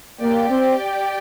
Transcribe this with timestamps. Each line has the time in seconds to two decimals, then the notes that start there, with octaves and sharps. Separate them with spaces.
0.21 A#3 G4 D5 G5
0.50 C4